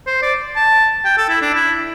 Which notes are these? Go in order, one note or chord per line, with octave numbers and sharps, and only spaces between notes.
C5
D5
A5
G5
A4
E4
D4
E4